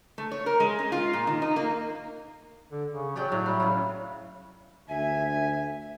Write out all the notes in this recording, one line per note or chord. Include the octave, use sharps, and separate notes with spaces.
A3
C#5
A#4
G#3
C#4
F4
A#2
D#3
D#4
A#3
D3
C#3
F#3 G4 D5 G5
A2
G3
A2 C#3
D2 E5 G#5